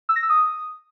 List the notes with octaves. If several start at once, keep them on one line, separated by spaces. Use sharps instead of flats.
E6
A#6
E6
D#6